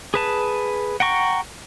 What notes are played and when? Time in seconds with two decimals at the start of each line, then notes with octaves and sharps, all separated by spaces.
0.14 G#4 B4 A5
1.00 F#5 G5 A#5 C#6